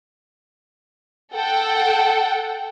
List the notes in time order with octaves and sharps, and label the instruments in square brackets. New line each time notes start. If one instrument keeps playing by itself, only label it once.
[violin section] A4 F#5 G5